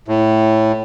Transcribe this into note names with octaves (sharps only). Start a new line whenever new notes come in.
A2